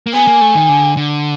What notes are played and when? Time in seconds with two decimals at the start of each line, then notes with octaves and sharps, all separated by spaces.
0.07 A#3
0.13 B3 G#5
0.27 A#3
0.41 A3
0.55 D#3
0.69 D3
0.97 D3